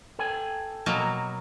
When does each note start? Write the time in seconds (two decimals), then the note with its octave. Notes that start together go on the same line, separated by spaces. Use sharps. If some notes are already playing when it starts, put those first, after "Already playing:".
0.19 A4 G5 G#5
0.86 B2 F#3 A#3